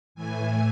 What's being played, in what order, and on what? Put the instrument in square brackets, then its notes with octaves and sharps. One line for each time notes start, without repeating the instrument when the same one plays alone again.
[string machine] A2 E3 A3 G#5